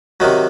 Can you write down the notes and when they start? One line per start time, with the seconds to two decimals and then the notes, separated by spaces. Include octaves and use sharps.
0.20 C3 D#3 F#3